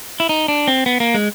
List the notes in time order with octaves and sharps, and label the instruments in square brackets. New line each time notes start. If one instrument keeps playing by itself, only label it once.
[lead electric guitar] E4
D#4
D4
C4
B3
A#3
G#3